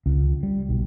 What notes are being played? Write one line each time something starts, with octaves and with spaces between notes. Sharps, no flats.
C#2
G3
B1